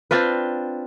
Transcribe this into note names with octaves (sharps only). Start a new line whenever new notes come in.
C4 D4 F4 B4